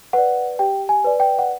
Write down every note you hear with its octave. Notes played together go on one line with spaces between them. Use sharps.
B4 D5 F#5
G4 G5
G#5
B4 D5
G5
F#5